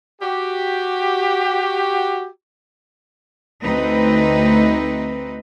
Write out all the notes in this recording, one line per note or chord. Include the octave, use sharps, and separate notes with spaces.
F#4 G4
D2 C4 D#4 B4